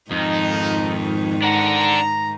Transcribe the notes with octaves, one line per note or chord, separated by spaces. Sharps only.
F2 G#2 D#3 D#4
D4 F#5 A#5